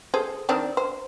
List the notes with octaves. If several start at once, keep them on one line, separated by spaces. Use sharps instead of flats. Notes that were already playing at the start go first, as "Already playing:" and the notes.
G#4 A4 C5
D#3 C4 D4
C5